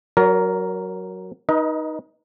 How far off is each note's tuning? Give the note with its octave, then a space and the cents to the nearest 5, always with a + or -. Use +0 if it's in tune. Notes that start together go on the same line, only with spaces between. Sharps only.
F#3 +0 A#4 +0 C#5 +45
D#4 +0 B4 -40 D#5 +30